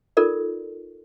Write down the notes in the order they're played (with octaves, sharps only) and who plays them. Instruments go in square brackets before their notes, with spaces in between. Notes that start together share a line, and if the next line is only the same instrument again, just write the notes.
[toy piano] D#4 F4 A4 A#4 D5